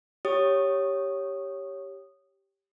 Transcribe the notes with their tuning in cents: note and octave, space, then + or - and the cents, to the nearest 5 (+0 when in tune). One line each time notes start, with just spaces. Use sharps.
G4 +0 C#5 +0 D#6 -15